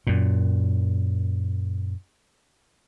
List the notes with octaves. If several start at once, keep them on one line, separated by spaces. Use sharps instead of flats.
F#2 A#2